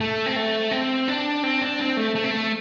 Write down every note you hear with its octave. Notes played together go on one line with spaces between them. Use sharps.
A3
C4
A3
C4
D4
C4
D4
C4
A3
A3
C4
A3